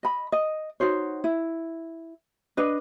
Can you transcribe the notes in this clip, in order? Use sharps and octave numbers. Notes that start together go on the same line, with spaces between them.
D#5 B5
D#5
D#4 F#4 C5 C#5
E4
D4 B4 D#5